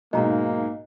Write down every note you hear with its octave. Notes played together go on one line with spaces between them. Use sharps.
B1 G#2 A#3 D#5 A#5